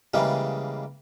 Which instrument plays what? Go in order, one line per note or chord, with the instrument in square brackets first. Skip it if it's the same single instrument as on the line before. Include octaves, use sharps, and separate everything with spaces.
[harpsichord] C#3 E3 G3 G#3 A#3